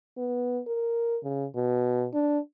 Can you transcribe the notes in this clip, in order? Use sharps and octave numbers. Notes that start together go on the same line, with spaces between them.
B3
A#4
C#3
B2
D4